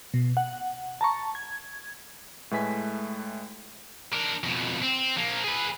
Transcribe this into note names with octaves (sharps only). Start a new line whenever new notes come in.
B2
F#5
A5 A#5 C#6
G#6
A2 G#3 A3 B4 G#5 B6
D4 A#4
F2 B2
C4
F3 A#3
G#4 B4